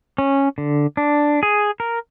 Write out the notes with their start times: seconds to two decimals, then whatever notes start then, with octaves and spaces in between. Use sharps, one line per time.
0.18 C#4
0.58 D3
0.97 D4
1.43 G#4
1.80 A#4